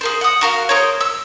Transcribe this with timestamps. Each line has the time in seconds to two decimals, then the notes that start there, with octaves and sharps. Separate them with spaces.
0.01 G#4 A#4 C5
0.21 F#5 D#6
0.41 F#4 A#4 F5
0.69 G#4 A#4 C5 C#5
1.01 E6